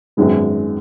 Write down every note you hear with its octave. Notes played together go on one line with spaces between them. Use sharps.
G#1 F#2 D#3 G#3 B3